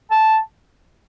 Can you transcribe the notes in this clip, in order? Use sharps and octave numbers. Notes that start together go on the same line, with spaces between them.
A5